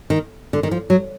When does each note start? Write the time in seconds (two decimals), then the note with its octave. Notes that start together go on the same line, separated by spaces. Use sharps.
0.10 D#3
0.53 D3
0.63 D#3
0.71 F3
0.90 F#3